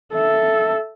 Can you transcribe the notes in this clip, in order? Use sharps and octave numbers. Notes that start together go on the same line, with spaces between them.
A4 E5